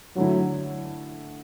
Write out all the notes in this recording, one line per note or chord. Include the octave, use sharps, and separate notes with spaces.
D3 F#3 A3 E4